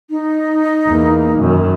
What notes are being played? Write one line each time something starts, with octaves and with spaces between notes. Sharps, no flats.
D#4
E2 A#3
F#2 D#3